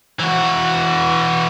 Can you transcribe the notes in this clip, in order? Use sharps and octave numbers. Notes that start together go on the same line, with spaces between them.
E3 F#4